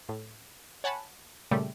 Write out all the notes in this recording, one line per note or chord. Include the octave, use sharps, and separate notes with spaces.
A2
C#5 F#5 G#5 A5 B5
A#2 C#3 G3 A3